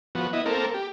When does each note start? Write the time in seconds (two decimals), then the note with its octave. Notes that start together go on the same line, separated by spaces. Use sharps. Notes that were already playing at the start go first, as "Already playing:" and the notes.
0.15 F3 B3 F#4
0.33 B3 E4 D#5
0.46 A#3 C4 A4 A#4
0.74 G4